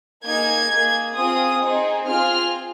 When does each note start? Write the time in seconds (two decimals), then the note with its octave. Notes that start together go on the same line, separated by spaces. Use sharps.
0.25 A#3 D#4 G#4 G#6
0.71 A#3 G#4
1.16 C4 F4 G#4 D#6
1.62 C4 D#4 G#4
2.07 C4 F4 G#4 F6